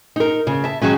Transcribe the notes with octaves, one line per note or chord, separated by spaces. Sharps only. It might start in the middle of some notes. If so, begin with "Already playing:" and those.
D#4 A#4
C#3
E5 A5
D#3 F#3 G#3 C#4